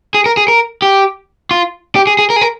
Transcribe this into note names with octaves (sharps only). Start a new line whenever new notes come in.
G#4
A#4
G#4
A#4
G4
F4
G4
G#4
G#4
A#4
G#4
A#4